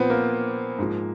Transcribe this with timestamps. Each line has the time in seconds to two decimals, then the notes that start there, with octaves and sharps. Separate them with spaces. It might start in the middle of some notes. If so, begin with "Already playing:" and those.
Already playing: A#2 F3 B3 C4
0.10 A#3
0.79 G#2 F3